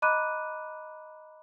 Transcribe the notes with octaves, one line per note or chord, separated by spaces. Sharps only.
D#5 A#5 B5 D6 F#6 D#7